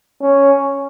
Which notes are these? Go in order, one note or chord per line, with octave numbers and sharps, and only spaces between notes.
C#4